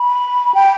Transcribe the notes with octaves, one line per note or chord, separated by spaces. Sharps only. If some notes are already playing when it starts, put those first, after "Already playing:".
Already playing: B5
G5